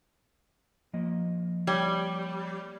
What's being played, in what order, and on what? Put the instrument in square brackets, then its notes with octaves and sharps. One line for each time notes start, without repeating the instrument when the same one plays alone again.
[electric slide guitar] F3 A#3 D#5
[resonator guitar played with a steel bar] G3 [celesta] C#5 G5 G#6